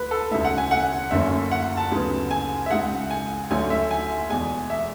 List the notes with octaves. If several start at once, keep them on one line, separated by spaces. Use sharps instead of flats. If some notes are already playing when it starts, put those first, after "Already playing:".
Already playing: D2 B4
A4
E1 D2 C#3 E5
F#5
G#5
F#5
F#1 F#2 D3 A3 C#4 E5
F#5
A5
D2 C#3 F#3 B3
G#5
E5
C#2 C#3 G#3 F#5
G#5
D2 D3 F#3 A3 C#4 G#5
E5
G#5
E2 B2 G#3 G#5
E5